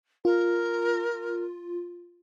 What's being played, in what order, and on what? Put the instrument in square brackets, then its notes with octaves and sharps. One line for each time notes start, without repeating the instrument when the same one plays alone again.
[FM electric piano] F4 [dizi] A#4